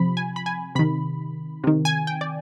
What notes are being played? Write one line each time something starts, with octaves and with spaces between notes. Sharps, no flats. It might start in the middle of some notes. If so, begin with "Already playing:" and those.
Already playing: C3 F3 B5
G#5
B5
G#5
C3 D#3 B5
C3 D#3
G#5
G5
D5